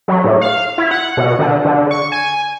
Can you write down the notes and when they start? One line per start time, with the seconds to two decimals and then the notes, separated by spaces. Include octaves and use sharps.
0.08 F#3
0.24 A2
0.41 F5
0.78 E4
0.91 F#5
1.17 B2
1.39 D3
1.65 D3
1.91 C#6
2.12 G#5